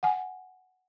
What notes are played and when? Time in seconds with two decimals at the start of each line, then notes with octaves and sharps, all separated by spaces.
0.03 F#5 G#5